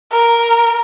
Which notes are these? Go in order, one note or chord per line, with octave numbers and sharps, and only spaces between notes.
A#4